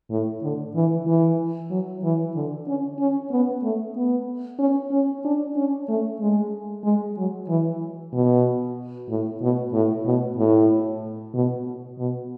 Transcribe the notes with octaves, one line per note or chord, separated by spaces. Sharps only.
A2
D3
E3
E3
F#3
E3
D3
C#4
C#4
B3
A3
B3
C#4
C#4
D4
C#4
A3
G#3
G#3
F#3
E3
B2
A2
B2
A2
B2
A2
B2
B2